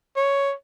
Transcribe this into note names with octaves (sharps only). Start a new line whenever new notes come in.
C#5